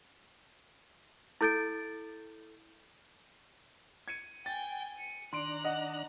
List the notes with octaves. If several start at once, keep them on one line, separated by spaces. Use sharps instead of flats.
E4 A4 G6 A6 D7
G#6 C#7 D#7
G5 G#5 A6
C#7 D#7
D#3 D4 D5 A#5 C6 F#6 D7
D#5 F#5